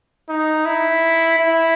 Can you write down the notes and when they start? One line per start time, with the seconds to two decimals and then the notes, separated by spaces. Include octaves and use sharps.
0.29 D#4
0.65 E4
1.39 E4